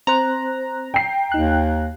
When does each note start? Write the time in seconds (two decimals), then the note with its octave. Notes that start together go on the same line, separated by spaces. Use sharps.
0.07 C4 C5 A#5 F#6
0.94 G5 C7
1.32 D#2 D#4 F#6